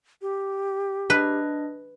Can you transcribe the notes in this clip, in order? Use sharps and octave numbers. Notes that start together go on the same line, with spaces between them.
G4
D4 B4 D#5